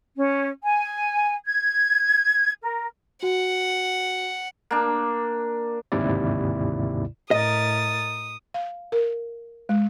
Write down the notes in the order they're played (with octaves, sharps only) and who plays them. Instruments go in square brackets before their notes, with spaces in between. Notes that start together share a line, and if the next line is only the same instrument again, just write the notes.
[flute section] C#4
G#5
G#6
A#4
[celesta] F#4 [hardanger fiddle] F#5
[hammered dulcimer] A#3 D4
[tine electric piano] G1 D#2 G#2 C3 E4 D5
[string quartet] A2 A#4 A6 [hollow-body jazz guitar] D#5 [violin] D#6
[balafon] F5
A#4
G#3